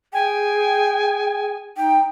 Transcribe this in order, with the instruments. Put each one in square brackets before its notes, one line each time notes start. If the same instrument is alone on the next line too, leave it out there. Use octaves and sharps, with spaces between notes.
[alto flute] G#4 [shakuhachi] G5 [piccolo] G#5
[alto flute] D#4 [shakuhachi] G5